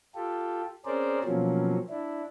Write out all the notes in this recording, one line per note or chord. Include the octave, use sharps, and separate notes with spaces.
F4 G4 A4
C4 C#4 G#4 A#4 C5 D5
B2 F3 F#3 A#3 C4 C#4
D4 E4